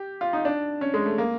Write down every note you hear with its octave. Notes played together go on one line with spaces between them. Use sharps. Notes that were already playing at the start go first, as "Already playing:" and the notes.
Already playing: G4
F4
D#4
D4
C#4
G#3
A3
A#3